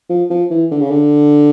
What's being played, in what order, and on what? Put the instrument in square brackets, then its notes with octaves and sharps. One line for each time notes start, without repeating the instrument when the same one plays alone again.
[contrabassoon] F3
F3
E3
D3
C#3
D3